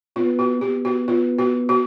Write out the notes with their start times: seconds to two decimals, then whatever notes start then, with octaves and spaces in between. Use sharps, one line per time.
0.16 B3 F4
0.39 F#4
0.61 B3 G4
0.85 F#4
1.08 F4
1.39 F#4
1.69 F#4